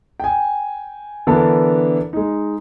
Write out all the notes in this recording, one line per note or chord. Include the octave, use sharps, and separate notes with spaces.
G5 G#5
D3 E3 B3 D4 A4 A#4
G#3 D#4